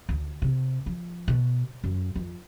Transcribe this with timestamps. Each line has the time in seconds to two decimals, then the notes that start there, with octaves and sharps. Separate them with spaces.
0.09 D2
0.42 C3
0.86 F3
1.28 B2
1.84 F#2
2.16 F2